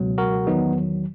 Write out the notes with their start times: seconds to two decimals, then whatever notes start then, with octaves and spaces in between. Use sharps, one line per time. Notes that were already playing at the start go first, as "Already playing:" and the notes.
Already playing: C#2 B2 F#3
0.18 F#4 A#4
0.47 E2 D#3 F#3 B3 D#4